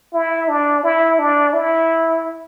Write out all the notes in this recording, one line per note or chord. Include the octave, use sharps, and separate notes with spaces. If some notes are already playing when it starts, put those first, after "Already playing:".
E4
D4
E4
D4
E4